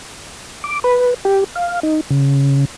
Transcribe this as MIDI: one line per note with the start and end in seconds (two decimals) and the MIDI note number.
0.64 0.80 86
0.84 1.14 71
1.25 1.44 67
1.56 1.80 77
1.83 2.01 63
2.10 2.65 49